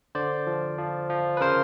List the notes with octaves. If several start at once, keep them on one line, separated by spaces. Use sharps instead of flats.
D3 C5 D5
F3
F3
F3
B4
C#3 A#4 C5